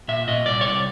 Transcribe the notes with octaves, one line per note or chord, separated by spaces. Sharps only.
A#2 E5
A#2 D#5
C2 D5
C#5
C2 D5